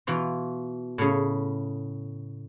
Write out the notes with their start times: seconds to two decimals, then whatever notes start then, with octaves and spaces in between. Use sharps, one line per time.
0.07 B2 E3 F4
0.98 A2 C#3